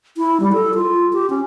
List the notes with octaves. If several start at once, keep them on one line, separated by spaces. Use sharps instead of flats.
E4
G3
A4
F4
G4
C#4